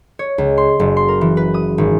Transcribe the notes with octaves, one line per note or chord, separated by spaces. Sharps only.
C#5
C#2
C6
F#1
C6
A#4
E3
B4
D#6
G#1